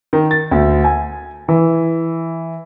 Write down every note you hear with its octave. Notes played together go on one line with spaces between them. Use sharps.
D#3
A6
D2
G#5
E3